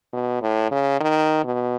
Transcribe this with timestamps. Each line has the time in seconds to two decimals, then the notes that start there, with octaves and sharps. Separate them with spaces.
0.13 B2
0.42 A2
0.71 C#3
1.00 D#3
1.44 B2